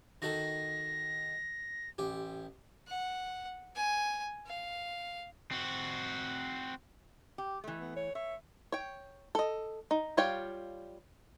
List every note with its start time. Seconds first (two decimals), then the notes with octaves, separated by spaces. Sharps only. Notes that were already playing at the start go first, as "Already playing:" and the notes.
0.22 D#3 F#4 A4 A#6
1.98 A1 G4
2.88 F#5
3.76 G#5
4.46 F5
5.51 C4 F#4
7.38 G4
7.64 E3 A3
7.80 B3
7.96 C#5
8.15 C#5 E5
8.72 C#5 G5
9.35 A4 D#5
9.91 D#4
10.17 G3 F4 C#5 F5 G5